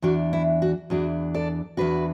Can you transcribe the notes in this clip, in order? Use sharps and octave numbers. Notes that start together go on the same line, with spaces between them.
E2 E3 D4 F#4
E4
F#4
E2 E3 D4 F#4
A4 D5
E2 E3 D4 F#4 B4